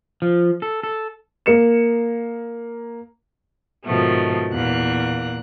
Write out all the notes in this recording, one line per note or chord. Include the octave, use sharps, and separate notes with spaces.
F3
A4
A4
A#3 C#7 E7
G#2 B2 D#3 F3 A3
E2 A#2 A#3 F#6